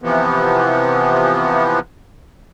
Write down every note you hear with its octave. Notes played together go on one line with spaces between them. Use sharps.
C3 E3 F3 B3